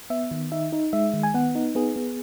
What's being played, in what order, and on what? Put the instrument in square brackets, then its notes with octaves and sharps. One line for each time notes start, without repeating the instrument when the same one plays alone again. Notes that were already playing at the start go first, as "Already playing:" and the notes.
[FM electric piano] B3 E5
D#3
D#4 E5
D#4
G#3 E5
D#3
G#5
B3 F#5
D#4
B3 G#4
B3